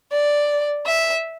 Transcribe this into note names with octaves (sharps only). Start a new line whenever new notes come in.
D5
E5